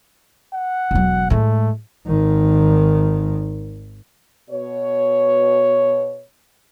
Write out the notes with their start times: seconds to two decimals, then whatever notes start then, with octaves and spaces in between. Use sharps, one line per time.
0.53 F#5
0.91 E1 F#3
1.30 A2 G#3 A3
2.07 G#1 D#3
4.50 B2 C#5